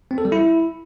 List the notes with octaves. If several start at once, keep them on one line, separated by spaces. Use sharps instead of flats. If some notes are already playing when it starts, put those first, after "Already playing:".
C4
A4
G3
E4